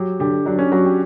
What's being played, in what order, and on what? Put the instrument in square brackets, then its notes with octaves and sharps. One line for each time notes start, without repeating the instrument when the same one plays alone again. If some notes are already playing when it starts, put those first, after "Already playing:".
Already playing: [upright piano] F#3 [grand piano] G4
[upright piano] D3 [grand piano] G4
[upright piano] F#3 [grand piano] D4
[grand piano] C#4
[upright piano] F#3 [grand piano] F#4
[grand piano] G4